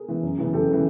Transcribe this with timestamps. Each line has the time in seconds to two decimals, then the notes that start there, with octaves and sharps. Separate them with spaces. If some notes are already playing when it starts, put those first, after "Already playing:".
Already playing: G#4 A#4
0.08 E3
0.23 F#2
0.38 C#3 E3
0.53 F#2 G4 A4
0.68 C#3 E3